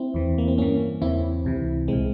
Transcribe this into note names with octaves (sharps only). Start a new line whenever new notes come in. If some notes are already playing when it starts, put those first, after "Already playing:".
Already playing: C4 E4
E2 E3
A#3
C4
G2 E3 A#3 C#4
E2 C#3 E3 C4 E4
C#2 C3 E3
C2 A#2 G#3 C4